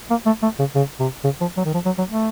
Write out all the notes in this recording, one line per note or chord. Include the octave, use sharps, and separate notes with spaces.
A#3
A3
A3
C#3
C#3
C3
C#3
F3
F#3
D#3
F3
F#3
F#3
A3